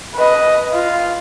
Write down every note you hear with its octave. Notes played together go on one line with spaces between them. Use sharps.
B4 D#5
F4